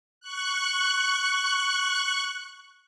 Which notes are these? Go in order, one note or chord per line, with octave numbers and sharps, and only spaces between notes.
C#6 F#6